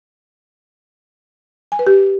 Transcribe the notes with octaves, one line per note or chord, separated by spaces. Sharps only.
G#5
B4
G4